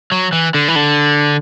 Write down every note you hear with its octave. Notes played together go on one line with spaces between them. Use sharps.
F#3
E3
D3
E3
D3